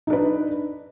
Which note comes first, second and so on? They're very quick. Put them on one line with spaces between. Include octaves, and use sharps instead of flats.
D#4 D4 B4